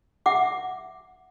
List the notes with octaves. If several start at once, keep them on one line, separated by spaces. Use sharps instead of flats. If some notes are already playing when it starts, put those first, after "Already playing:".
E5 F#5 D6